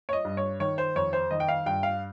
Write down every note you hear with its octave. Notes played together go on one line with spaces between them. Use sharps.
C#5
D#5
G2
C#5
D#3 C#5
C5
F2 C#5
C5
D#3 D#5
G5
F5
G2 G5
F5